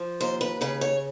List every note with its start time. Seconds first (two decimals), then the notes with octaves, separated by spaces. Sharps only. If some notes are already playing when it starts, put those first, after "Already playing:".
Already playing: F3
0.20 D#2 C5
0.41 B4
0.61 C#3 B4
0.81 C#5